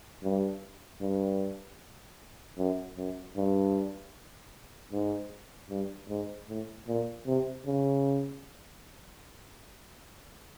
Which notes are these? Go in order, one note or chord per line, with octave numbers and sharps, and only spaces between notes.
G2
G2
F#2
F#2
G2
G#2
G2
G#2
A2
A#2
C3
C#3